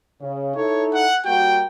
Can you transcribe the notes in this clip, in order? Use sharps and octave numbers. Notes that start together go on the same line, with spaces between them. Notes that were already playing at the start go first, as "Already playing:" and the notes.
C#3
D#4 E4 A4 C#5
F#5
G3 A#3 F#4 G5